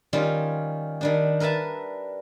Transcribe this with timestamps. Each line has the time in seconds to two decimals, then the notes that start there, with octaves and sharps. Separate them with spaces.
0.13 D#3 G3 C#4 F4
1.01 D#3 G3 D4
1.40 A#4 B4 E5 A5 A#5